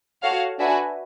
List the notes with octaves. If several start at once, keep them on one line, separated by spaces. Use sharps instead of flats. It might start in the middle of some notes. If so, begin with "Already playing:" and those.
F#4 A4 C#5 F5
D4 F#4 B4 E5 G#5